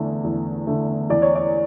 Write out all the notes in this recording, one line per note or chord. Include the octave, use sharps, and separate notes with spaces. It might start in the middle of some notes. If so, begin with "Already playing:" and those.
Already playing: E2 D3 A3
E2
D3 A3
E2 D5
C#5
D5